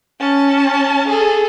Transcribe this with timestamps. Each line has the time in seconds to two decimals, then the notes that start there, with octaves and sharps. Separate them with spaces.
0.20 C#4 A5
1.08 G#4 A4